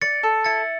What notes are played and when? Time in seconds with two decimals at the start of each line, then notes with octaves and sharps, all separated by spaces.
0.02 D5 A6 C#7
0.23 A4
0.45 E4 A6 C#7